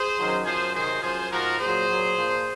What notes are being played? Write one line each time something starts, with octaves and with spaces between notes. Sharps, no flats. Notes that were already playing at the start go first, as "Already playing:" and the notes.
Already playing: G#4 C5
F#2 D#3 F#3
F#2 F3 G#4 C5
C3 D#3 F#3 G#4 C5
F#2 F3 G#4 C5
G#2 F3 F#4 A#4
A#2 F#3 G#4 C5
A#2 F#3
A#2 F3